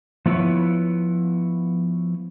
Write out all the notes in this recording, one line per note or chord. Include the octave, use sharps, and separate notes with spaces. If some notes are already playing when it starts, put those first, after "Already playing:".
F3 B3 E4 B4 C#5